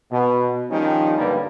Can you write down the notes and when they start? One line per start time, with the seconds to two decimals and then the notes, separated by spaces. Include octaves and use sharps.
0.12 B2
0.70 D#3 F3 G3 C#4 D#4
1.18 B1 G2 D3 G3 A#3 B4